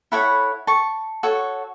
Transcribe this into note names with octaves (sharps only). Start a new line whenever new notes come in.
E4 A4 C#5 F#5 B5
A5 C#6
F#4 A4 C#5